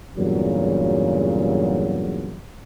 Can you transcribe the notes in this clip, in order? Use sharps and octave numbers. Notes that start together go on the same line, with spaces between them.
E2 G2 A#2 C#3 F#3